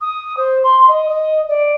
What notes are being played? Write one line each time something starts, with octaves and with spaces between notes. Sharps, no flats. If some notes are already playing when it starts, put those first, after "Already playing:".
D#6
C5
C6
D#5
D#5
D5